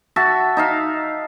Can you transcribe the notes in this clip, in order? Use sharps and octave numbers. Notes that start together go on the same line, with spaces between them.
F#4 E5 A5
D#4 E5 F5